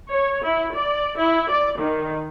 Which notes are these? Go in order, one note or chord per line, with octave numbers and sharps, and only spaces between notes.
C#5
E4
D5
E4
D5
D#3